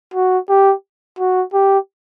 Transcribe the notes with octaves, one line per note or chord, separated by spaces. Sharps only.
F#4
G4
F#4
G4